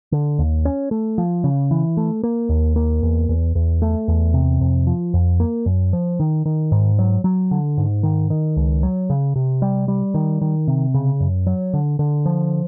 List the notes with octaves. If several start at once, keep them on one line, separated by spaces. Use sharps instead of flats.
D3
D#2
C#4
A3
F3
C#3
E3
A3
A#3
D#2
A#3
E2
E2
E2
A3
E2
C3
F2
F3
F2
A#3
F#2
F3
D#3
D#3
G#2
F#3
F#3
D3
G#2
D#3
D#3
C#2
F#3
C#3
C3
G3
G3
D#3
D#3
C3
C#3
F#2
F#3
D3
D3
F3